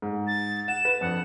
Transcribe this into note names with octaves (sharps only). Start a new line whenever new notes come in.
G#2
A6
F#5 E7
B4
F2 D4 F#5